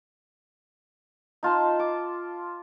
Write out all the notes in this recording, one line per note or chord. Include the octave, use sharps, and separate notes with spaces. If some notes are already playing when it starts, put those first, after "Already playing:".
D#4 F4 A5 C6
D6